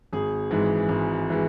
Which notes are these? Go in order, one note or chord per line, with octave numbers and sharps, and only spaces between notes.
G#1 G#4
G#2 E3 G#3
G#1
E3 G#3